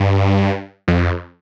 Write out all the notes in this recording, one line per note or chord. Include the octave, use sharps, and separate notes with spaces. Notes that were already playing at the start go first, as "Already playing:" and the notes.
Already playing: G2
F2